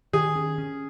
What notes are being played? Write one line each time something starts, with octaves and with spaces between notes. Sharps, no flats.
D#3 G#4
C#4
C#4